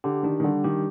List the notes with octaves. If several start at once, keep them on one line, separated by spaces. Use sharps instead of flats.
D3 G4
D#3 D4
D#3
D3 G3
D#3 G4